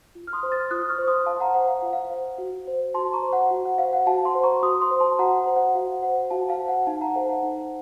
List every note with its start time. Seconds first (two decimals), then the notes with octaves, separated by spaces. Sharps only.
0.15 F4
0.27 F6
0.33 C6 D#6
0.43 C5
0.52 F6 A6
0.71 F4 D#6 F#6
0.82 D#6
0.89 C#6 F6
0.98 C5
1.07 C6 D#6
1.26 F4 F5 A5
1.40 F#5 A#5
1.54 C5 F#5
1.68 F5
1.81 F4 F#5
1.93 F5
2.11 C5
2.38 F#4
2.67 C5
2.94 F#4 A5 C6
3.13 A#5 C#6
3.23 C5
3.33 F#5
3.51 F#4
3.65 F#5
3.78 C5 F5
3.93 F#5
4.06 F#4 F5 A5
4.25 A5 C6
4.35 C5
4.44 A#5 C#6
4.63 F#4 C6 D#6
4.81 C6 D#6
4.91 C5
5.00 A5 C6
5.19 F#4 F#5 A#5
5.37 F#5
5.47 C5
5.56 F#5
5.75 F#4 F5
6.03 C5 F#5
6.30 F#4 F5 A5
6.49 F5 A5
6.59 C5
6.68 F#5
6.87 D#4 F5 A5
7.01 F#5 A#5
7.15 A4 C5 F5 A5
7.29 F#5
7.43 D#4